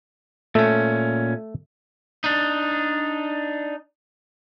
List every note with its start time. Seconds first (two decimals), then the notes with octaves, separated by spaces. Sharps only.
0.55 A#2 A3 C#4
2.24 D4 D#4